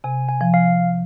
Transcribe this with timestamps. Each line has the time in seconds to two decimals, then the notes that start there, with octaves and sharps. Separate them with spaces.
0.04 C3 G#5
0.29 G#5
0.41 F3
0.54 F5